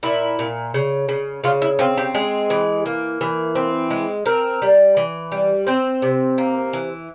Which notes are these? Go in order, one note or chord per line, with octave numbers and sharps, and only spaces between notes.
A#2 E4
A#2
C#3
C#3
C#3 F4
E4
C4 F4
G4
G#3 G#4
E3
A#3
E3
C4
G#3
C4 A#4
G3
E3
G3
C4 C5
C3
A#3
E3